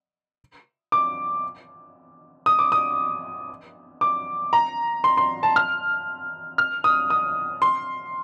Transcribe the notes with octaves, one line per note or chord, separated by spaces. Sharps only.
D6
D#6
D6
D#6
D6
A#5
C6
C6
A5
F6
F6
D#6
D#6
C6